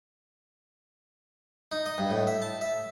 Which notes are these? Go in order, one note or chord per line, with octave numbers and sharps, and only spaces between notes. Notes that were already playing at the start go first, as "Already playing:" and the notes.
D#4
D#5
G2
A2
E5
A5
E5